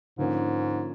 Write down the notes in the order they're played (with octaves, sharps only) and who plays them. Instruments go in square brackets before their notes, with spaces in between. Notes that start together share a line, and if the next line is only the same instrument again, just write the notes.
[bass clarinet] G#2 [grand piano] D3 F3 A#3 C#4